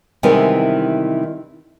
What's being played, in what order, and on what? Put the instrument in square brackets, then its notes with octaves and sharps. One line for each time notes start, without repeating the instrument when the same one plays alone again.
[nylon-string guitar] C3 D#3 E3 G3 G#3 B3